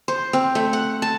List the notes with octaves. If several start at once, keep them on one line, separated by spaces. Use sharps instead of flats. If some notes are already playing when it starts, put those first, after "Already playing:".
C5
C4
A3
F#5
A5